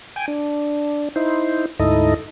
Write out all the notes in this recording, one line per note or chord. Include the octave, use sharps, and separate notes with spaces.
G5 G#5
D4
D#4 E4 C5
D2 G#2 D#4 E4 A4 D#5